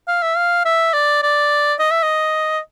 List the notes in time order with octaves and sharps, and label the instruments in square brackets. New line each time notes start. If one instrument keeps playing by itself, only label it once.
[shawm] F5
E5
F5
E5
D5
D5
D#5
E5
D#5